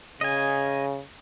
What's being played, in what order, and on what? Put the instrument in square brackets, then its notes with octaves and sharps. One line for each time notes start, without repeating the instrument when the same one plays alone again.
[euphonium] C#3 [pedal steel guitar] D#5 G#5